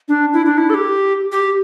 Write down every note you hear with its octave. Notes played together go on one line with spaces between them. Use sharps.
D4
E4
D4
E4
A4
G4
G4